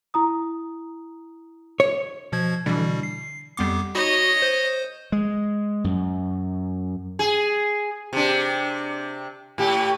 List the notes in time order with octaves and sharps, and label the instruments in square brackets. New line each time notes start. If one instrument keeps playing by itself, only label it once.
[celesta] E4 A#5 D#6
[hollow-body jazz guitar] C#5
[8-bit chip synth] B2 F3 G#6
[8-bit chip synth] B2 G3 [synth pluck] D3 E3
[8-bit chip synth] C7
[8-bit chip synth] F2 B3 D6 [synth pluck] G3 C6
[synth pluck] D#4 [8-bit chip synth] F#4 [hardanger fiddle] C#5 D#5
[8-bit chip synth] C5
[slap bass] G#3
F#2
[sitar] G#4
C3 D4
A2 G4